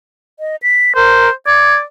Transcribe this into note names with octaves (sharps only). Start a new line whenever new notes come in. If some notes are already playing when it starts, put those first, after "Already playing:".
D#5
B6
A#4 C5
D5 G#6